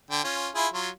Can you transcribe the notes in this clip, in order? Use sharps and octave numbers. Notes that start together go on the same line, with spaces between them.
D3 G5
C#4 F4
E4 F4 G#4
F#3 F4